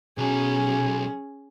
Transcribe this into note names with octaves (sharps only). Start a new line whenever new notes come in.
B1 F#3 C#4 G#4